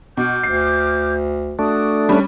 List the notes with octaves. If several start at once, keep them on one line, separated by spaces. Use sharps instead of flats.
B2 D6 F6 G6
D2 C7
A3 D4 F#4 D#6
G3 C#4